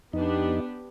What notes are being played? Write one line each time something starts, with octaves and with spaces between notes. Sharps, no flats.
F2 B3 D4 D#4 G4